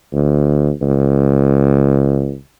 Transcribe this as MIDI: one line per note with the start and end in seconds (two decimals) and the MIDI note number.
0.13 0.71 38
0.82 2.35 37